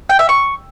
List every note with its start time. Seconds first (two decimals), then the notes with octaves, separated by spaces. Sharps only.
0.09 G5
0.19 E5
0.29 C#6